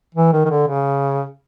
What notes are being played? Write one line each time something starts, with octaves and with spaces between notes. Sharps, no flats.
E3
D#3
D#3
D3
C#3